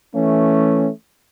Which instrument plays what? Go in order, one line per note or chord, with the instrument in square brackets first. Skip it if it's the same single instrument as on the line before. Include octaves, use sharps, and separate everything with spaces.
[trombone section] E3 A3 C#4